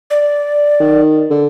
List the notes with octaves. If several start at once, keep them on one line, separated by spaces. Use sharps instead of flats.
D5
D#3
D3